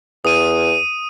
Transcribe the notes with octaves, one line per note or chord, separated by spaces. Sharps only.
E2 D#6 D#7